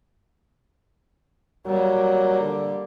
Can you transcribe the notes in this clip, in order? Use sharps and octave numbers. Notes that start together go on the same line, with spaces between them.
F#3 G3 A#3
D3